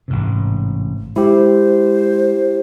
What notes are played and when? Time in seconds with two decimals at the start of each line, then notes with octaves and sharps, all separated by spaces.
0.08 A1 G#2 C3
1.16 G#3 E4 G4 C5